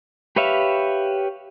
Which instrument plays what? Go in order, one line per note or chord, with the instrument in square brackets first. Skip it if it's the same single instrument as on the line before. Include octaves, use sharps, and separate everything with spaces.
[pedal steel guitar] G4 B4 C#5 E5 F5